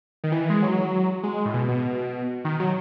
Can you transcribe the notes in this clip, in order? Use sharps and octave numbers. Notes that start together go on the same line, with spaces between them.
D#3
E3
G#3
F#3
G#3
A2
B2
B2
D#3
F#3